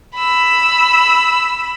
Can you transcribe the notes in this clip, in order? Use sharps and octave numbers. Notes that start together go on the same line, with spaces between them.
B5 E6